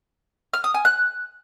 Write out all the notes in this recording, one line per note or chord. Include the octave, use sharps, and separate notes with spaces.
F6
D#6
G#5
F#6